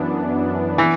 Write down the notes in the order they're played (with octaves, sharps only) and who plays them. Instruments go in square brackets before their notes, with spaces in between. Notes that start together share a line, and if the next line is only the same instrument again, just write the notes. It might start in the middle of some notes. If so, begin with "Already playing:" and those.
Already playing: [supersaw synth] F#2 E3 B3 D4
[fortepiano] E3